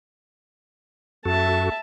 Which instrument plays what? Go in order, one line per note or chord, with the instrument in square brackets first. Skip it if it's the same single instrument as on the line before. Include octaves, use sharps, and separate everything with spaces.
[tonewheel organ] F#2 F#4 A4 [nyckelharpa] E5 A5